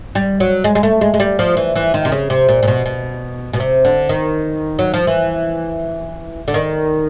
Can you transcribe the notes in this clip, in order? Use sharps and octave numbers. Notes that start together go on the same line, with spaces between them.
G3
F#3
G#3
G#3
A3
G#3
G#3
G3
F3
E3
E3
D#3
C3
C#3
C3
A#2
A#2
B2
B2
B2
C3
D3
D#3
F#3
F3
E3
D3
D#3